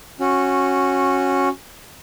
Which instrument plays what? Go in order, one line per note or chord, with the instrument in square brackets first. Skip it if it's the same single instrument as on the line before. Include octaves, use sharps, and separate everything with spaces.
[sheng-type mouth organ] C#4 F#4